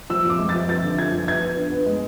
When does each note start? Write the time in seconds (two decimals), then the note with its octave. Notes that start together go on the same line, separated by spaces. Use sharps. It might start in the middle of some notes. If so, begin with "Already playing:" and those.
0.10 F3 E6
0.24 F2
0.30 D6
0.38 G#3
0.49 A6
0.54 F3
0.69 F2 A6
0.83 D3
0.98 F3 G#6
1.12 F3
1.27 B3 G#6
1.43 B3
1.57 D4
1.71 B3
1.86 G#3